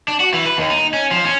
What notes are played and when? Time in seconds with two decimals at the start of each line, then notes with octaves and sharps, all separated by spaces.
0.08 D4
0.20 F#4
0.33 E3
0.46 B4
0.58 D#2
0.70 D#4
0.94 C#4
1.11 F3
1.25 C#4